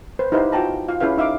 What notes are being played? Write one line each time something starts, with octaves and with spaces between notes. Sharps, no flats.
B4 C5
D#4 E4 G4 B4 C5 F5
F4 F#4 G5 A5 A#5
F4 F5
C#4 E4 G#4 B4 F5
D#4 E5 F5 D6